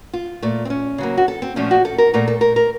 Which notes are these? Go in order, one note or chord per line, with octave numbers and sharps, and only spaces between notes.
F4
A#2 A3
C4
C#4
C#3 F#3 A#3
F#4
A4
C4
A#2 F3 A3 C#4
F#4
A4
A#4
A#2 A3 A#4
A4
A#4
A#4